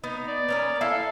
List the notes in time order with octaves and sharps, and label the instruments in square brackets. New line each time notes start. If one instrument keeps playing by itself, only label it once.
[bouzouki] B3 [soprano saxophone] D#4
[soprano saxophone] D5
[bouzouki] B3 C#4 A#4
[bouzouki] E4 A4 [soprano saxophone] F5